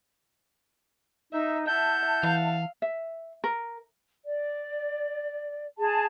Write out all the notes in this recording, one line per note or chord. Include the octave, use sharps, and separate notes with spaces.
D#4 E5
E4 E5 F#5 A5 G6
E3 F5
E5
A#4
D5
G#4 A5